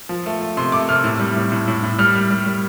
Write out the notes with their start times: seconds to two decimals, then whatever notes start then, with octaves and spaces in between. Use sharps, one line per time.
0.09 F3
0.26 A3
0.41 A3
0.57 C3 C6
0.72 A3 D6
0.89 C3 F6
1.04 A2
1.19 G3
1.36 A2
1.52 A2
1.68 A2
1.83 A2
1.98 G3 F6
2.15 G3
2.30 G3
2.46 G3